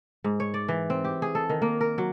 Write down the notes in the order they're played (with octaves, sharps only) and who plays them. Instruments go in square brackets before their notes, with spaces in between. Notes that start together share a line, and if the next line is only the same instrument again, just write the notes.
[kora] G#2
C#5
D5
E3
C4
G4
G#4
A4
D#3
A#3
A#4
F#3